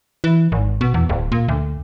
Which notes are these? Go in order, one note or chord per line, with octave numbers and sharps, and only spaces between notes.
E3
G#1
B2
E2
D1
A#2
D2